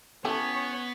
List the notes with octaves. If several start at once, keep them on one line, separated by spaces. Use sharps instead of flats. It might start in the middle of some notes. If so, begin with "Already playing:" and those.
E3 A3 B3 C#4 G4 C#5